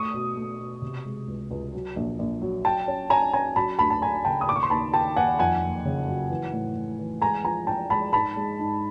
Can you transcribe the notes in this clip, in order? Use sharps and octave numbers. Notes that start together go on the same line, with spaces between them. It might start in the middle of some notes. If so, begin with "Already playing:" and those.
Already playing: A3 C#6 D#6
B2
A3
B2
C3
G#3
C#2
C#2
F#3
A#1
A#1
F#3
F#3 G5 A5
C#4
C#4 G#5 A#5
C#4 G#5 A#5
F#3 A5 B5
D2 A5 B5
A5
F#3 G#5 A#5
C#3 G5 A5
D#6
D#2 D6
C#6
C6
D#2 A5 B5
D#3 G5 A5
D#2 F#5 G#5
F2 F#5 G#5
F#1
C#3
F#3
E3
A2
A2
E3
G#3 G#5 A#5
F3 G#5 A#5
F3 G5 A5
G#3 A5 B5
G#2 A5 B5
G#3
G#2